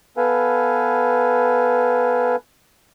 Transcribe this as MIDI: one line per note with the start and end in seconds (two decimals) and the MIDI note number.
0.17 2.36 59
0.17 2.36 69
0.17 2.36 71
0.17 2.36 77
0.17 2.36 80